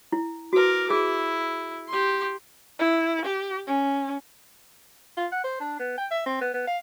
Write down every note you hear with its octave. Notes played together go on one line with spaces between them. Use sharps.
E4
F#4 A#4 B4 D6
E4 G#4
G4 C6
E4
G4
C#4
F4
F#5
C5
D4
B3
G5
E5
C4
B3
B3
F5